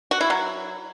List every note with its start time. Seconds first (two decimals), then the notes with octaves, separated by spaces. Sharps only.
0.11 F#4
0.21 E4
0.30 F#3